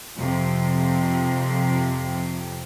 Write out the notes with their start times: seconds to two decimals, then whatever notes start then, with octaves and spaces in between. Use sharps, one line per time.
0.16 F2 C3